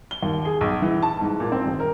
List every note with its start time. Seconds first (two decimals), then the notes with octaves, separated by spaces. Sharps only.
0.11 G7
0.23 D#2
0.45 G#4
0.61 B1
0.82 E3
1.02 A5
1.21 G#2
1.40 A#2
1.52 C4
1.65 D#1
1.80 A#4